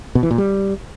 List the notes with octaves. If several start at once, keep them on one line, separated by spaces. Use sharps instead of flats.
B2
E3
A#2
G3